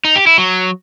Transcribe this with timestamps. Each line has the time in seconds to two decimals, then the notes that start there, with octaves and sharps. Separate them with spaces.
0.05 D#4
0.16 G4
0.27 E4
0.38 F#3